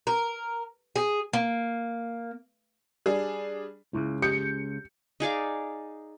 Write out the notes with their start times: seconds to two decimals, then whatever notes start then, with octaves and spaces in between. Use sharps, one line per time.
0.07 A#4
0.96 G#4
1.33 A#3
3.06 G3 D4 G#4
3.93 C#2 A2 C#3 E4
4.22 G4 G6 C#7
5.20 D#4 G#4 D5 F5